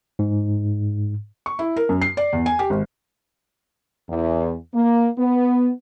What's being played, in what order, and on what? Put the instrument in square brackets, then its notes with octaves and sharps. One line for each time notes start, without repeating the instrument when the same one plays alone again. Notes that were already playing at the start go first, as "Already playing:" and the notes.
[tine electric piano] G#2
[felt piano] C#6
E4
A#4
F#2
C7
D5
E2
G#5
G4
G#1
[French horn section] E2
A#3
B3